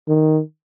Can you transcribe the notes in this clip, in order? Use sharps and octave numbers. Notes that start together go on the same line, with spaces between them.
D#3